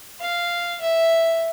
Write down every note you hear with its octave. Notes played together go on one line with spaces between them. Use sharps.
F5
E5